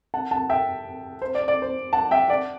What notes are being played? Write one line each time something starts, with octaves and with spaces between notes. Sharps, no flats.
F#5 A5
F#5 A5
E5 G5
C5
D5
D5
C5
F#5 A5
E5 G5
D5 F#5